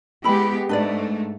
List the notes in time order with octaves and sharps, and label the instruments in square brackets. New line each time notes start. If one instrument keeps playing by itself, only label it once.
[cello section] G#3 B3 G4 [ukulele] E4 B5
[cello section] G#2 A3 [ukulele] D4 B4 D5